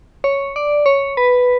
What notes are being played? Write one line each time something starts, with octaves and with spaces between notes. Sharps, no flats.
C#5
D5
C#5
B4